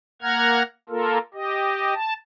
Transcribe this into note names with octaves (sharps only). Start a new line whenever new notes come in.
A#3 F#5 A#5 F6 G#6
A#3 F4 A4 A#4
G4 D#5
A5